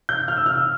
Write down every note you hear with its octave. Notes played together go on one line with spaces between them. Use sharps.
G6
F6
E6
F6
E6